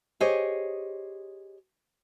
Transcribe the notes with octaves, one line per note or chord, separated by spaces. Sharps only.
G4 G#4 C5 C#5 D#5